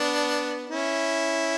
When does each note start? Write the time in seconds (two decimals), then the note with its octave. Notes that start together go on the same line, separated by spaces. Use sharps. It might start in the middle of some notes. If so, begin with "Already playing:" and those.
Already playing: B3 D4
0.70 C#4 E4